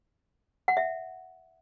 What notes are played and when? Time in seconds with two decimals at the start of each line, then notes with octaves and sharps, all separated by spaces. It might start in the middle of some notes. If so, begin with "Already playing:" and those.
0.68 F#5
0.77 E5